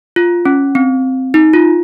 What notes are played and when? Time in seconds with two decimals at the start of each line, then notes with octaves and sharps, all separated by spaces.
0.16 F4
0.45 C#4
0.75 C4
1.34 D#4
1.53 F4